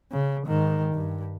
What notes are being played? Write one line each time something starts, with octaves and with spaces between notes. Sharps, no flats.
C#3
G#2 D#3
G2